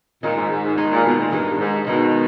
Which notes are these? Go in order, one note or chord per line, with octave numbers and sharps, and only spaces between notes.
A#2 D#3 G#3 D#4
G#2
G#2
G#2
D#3 G#3 D#4
A#2
B2
A#2
G2 D#3 G#3 D#4
G2
G#2
B2 D#3 G#3 D#4